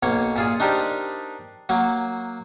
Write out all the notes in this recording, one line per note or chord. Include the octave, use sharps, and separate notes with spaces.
B1 A#3 C#5
A#2 F4 G#4
D4 D#4 G4 A#4 C5 D5
F#3 A#3